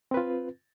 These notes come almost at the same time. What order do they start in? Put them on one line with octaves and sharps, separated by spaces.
C4 B4 F4